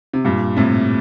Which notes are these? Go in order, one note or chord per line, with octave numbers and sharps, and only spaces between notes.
C3
G2 A#2
A2 C3